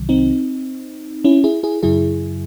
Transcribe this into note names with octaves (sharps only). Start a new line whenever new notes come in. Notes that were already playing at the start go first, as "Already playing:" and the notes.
Already playing: C2 C3 D#3 F#3
C4 D#4
C#4 E4
E4 G#4
E4 G#4
F#2 C#3 F#3 E4 G#4